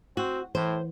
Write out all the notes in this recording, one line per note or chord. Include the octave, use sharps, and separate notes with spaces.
C4 F#4
A2 E3 C5